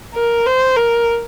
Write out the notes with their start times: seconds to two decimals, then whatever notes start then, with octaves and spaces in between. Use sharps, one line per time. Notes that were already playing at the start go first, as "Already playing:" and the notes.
0.14 A#4
0.46 C5
0.76 A#4